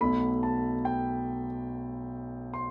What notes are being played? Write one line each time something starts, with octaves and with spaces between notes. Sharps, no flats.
B1 B2 A3 B5
A5
G5
C6